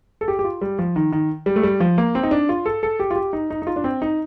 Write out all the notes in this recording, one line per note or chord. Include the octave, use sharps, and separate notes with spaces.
A4
G4
G4
F4
G3
F3
D#3
D#3
G3
A3
G3
F3
A#3
C4
D#4
D4
F4
A4
A4
G4
F4
G4
D#4
D#4
D#4
F4
D4
C4
D#4